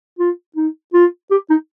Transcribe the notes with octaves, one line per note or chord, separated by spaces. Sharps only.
F4
D#4
F4
G4
D#4